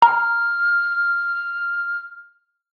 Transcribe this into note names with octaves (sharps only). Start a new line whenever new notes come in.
A#5 F6